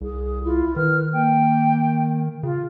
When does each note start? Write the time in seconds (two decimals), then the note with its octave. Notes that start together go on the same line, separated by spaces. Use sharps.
0.01 C2 G#4
0.44 E4 F4
0.76 D#3 B4 F6
1.13 A#3 G5
2.43 C#3 F4